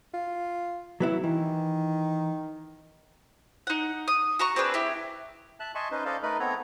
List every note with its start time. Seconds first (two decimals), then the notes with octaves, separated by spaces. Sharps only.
0.13 F4
1.00 F#3 B3 E4
1.23 D#3 E3
3.67 D#4 F#5
4.08 D#6
4.39 F#4 A#5 C#6
4.56 C4 D4 G#4 B4
4.74 E4 G4
5.60 E5 A5 F#6
5.75 D#5 E5 G#5 A5 C6 C#6
5.91 C#4 D#4 B4 C5 D#5
6.05 A4 C5 D5 D#5 F5
6.23 A3 D#4 A#4 B4 D#5 B5
6.40 B3 C4 A4 C#5 A#5